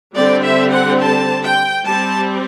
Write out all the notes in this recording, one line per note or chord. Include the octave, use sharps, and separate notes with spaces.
D3 G3 C4 D5
E5
F#5
A5
G5
G3 C4 A5